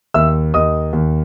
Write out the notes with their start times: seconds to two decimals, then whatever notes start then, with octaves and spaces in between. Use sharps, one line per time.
0.14 D#2 E5 E6
0.54 D#2 D#5 D#6
0.93 D#2